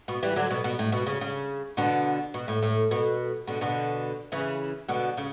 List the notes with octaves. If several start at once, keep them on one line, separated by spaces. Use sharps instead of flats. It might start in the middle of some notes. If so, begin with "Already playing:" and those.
B2
E3 G3
D3 F#3
B2
B2
A2
B2
C#3
C#3
B2 D3
B2
A2
A2
B2
B2 D3
B2 D3
C#3 E3
B2 D3
C#3